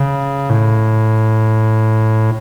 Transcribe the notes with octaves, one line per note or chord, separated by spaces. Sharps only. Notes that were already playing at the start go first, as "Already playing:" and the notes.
Already playing: C#3
A2